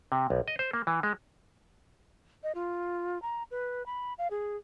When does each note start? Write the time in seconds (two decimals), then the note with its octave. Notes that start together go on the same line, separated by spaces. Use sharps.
0.12 C3
0.30 B1
0.48 D#5
0.59 C5
0.73 A#3
0.87 E3
1.03 G#3
2.44 D#5
2.55 F4
3.22 A#5
3.51 B4
3.86 B5
4.18 F5
4.31 G#4